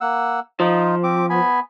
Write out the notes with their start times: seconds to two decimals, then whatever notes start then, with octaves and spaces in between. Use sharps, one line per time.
0.01 A#3 F#5 E6
0.60 F3 D#4 F4
1.03 C4 D6
1.30 B3 G#5 B5